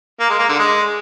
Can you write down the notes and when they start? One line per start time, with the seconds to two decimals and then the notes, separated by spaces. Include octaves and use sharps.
0.20 A#3
0.30 G#3
0.39 A#3
0.49 D3
0.59 G#3